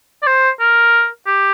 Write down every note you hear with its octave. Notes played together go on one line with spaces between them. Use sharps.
D5
C5
A#4
G4